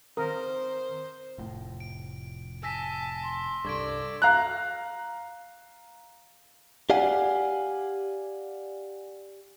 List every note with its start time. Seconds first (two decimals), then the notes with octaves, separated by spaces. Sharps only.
0.17 D#3 C4 A#4 C5 D#6
1.38 F1 A2
1.80 D7
2.63 G#5 A5 E6 A#6 B6
3.23 C6
3.65 C2 G2 A4 D5 C#6 G#6 D7
4.22 F5 A#5 F#6
6.90 G4 D5 F5 F#5 G#5